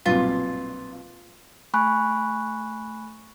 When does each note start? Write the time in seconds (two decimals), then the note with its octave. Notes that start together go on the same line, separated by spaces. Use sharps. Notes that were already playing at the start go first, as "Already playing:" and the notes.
0.06 B1 G2 A#2 C4 F4 B4
1.74 A3 G#5 B5 C#6 F#6